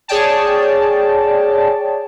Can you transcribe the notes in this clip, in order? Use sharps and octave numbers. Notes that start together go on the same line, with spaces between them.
G#4 C#5 D5 G5 A5